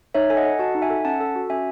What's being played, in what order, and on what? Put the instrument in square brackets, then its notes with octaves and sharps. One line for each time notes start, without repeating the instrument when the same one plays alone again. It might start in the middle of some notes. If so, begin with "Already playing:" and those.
[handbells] D#4 C#5 E5
A4 G#5
D#5 F#5
A4
F#4 F#5 A5
D#4
E5 G#5
A4
C#4 F#5 A5
A4
F#4
C#4 E5 G#5